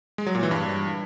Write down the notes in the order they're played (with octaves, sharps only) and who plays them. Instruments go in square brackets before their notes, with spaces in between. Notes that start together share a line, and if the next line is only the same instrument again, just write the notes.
[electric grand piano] G#3
F#3
A#2
E3
G2